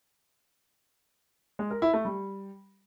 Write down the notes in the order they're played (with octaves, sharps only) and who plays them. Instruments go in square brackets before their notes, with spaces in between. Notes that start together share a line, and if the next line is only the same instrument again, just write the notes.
[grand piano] G#3
A#4
E4
A3
G3